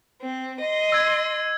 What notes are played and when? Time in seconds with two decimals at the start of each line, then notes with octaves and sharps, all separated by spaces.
0.21 C4
0.61 D#5 C6
0.92 E6 G#6